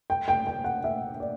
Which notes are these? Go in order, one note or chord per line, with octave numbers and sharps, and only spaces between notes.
G5
G5
G5
F#5
E5
D5